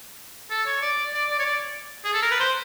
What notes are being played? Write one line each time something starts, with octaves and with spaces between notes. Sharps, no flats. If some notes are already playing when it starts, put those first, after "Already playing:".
A4
C#5
D5
D5
D5
C#5
D5
G#4
A4
A#4
B4
C5